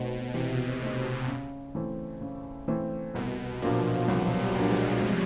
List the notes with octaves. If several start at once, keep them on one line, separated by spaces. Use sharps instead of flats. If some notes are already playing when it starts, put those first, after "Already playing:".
Already playing: B2 A3 C4 D#4
C3 E3
A3 C4 D#4
C#3
E3 A3 C4
C#3
E3 A3 C4
C2 B2
A#2 F3 F#3 A#3 D4
C2 F#3
G3
A#2 F#3 A#3 D4
G#3
C3